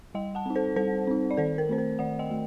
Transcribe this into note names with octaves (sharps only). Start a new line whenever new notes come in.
G3 D#5 G5
F#5 A5
C4 D#4
A4 C5
G3 A4 C5
C4 D#4
D5
D#3 A4 C5
A#4
A3 C4 C5
A#4
D#3 D5 F#5
D#5 G5
A3